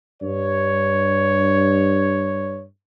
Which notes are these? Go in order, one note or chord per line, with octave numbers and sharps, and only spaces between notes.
G2 C#5